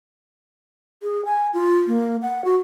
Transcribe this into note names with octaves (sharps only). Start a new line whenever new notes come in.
G#4
G#5
F4
A#3
F#5
F#4